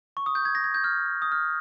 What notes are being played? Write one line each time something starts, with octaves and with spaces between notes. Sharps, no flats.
C#6
D#6
G6
G#6
A#6
G#6
G6
F6
D#6
F6